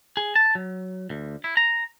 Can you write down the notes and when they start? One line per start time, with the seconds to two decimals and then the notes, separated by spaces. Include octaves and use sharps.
0.17 G#4
0.36 A5
0.55 F#3
1.10 D2
1.44 E4
1.57 A#5